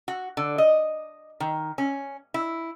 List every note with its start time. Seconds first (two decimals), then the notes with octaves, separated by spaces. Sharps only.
0.08 F#4
0.37 D3
0.58 D#5
1.40 D#3
1.78 C#4
2.34 E4